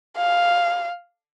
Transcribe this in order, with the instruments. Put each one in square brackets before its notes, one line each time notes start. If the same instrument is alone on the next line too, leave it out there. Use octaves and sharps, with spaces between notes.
[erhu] F5